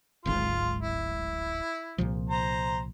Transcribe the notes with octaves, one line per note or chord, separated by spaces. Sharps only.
D1 G#1 G#2 F4
E4
C2 A#2 F3
C5 A#5